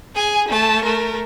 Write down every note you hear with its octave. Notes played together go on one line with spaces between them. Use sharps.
G#4 G#5
A3 A5
A3 A#4